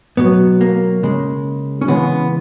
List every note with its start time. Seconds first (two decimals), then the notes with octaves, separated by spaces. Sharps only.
0.17 B2 F#3 B3
0.61 A#3
1.03 C#3 G#3
1.81 C#4
1.88 C#3 E3 G#3 B3